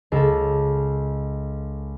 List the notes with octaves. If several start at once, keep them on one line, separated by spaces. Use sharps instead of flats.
C#2 A4